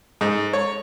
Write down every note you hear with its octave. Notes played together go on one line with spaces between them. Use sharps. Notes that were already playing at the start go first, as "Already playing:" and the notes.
G#2
C#5